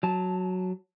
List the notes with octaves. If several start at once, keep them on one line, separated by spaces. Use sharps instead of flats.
F#3 A5